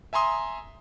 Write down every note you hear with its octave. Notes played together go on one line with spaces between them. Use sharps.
E5 G#5 A#5 C6 D#6